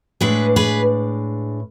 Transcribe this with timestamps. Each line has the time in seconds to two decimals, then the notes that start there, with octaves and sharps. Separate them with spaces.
0.21 A2 G#3 D4 G#4 B4
0.56 G#4 B4